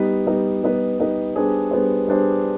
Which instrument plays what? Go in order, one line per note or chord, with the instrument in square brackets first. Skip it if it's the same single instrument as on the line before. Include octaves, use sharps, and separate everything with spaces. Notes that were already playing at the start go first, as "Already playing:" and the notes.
Already playing: [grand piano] G3 B3 D#4 B4
G3 B3 D#4 B4
G3 B3 D#4 B4
G3 B3 D#4 B4
G3 B3 D4 G#4 C5
G3 B3 D4 G#4 C5
G3 B3 D4 G#4 C5